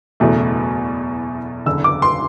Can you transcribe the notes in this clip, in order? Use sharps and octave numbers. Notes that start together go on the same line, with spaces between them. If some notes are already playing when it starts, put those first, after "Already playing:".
F#1 E2 B2 A3
F#1 E2 D3 E6
D6
C6